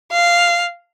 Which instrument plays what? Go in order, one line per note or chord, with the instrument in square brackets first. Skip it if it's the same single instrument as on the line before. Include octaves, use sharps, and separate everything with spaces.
[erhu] F5